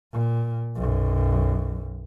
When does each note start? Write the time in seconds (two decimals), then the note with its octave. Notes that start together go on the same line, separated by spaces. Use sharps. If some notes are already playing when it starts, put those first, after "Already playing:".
0.12 A#2
0.76 B1 F#2